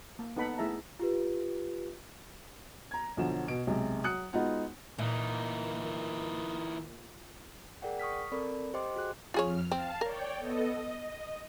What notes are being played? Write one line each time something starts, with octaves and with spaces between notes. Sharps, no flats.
A#3
B3 D#4 A4 F#5 B5
A3 E4 G#4 E5 A5 A#5
F4 G4 B4
A#5 G#6
B1 D3 F3 F#3 E7
B2 D7
B1 C3 G#3
F#3 D#6 F#6 C#7
G#3 B3 D#4 F4 F#4 F#5
A#2 E3 D#4
G#4 A#4 D5 F#5 G5
C#6 D#6 F6 B6
C4 A4 A#4 D5 B5
G4 C5 D#5 G5 C6 D6
F#4 G#4 F#6
F2 F4 G#4 C#5 F6
C4 F5 A5
A#4 C#5 D5 G5
B3 A4 D#5
D#5